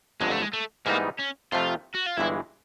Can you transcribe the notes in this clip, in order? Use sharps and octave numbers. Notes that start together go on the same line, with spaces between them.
G1 F2 D3 F#3 G#3
A3
G#3
A3
G#2 E3 G3 A#3 B3 D#4
C#4
F2 C3 F3 A3 F4
F#4
F4
G1 G2 E3 G#3 E4